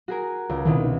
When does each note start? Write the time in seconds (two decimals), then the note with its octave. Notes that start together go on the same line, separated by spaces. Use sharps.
0.08 F#4 G#4 A#4
0.49 C#2
0.65 C2 B2 D#3